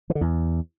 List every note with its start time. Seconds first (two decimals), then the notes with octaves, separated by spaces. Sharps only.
0.10 E3
0.15 D3
0.21 E2